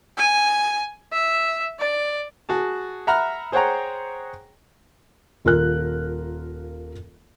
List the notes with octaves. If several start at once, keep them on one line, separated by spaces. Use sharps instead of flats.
G#5
E5
D5
F#4 G#4 A5
E5 F#5 A#5 B5 F6
G#4 C5 C#5 F#5 G5 A#5
D#1 F4 A#4 F#6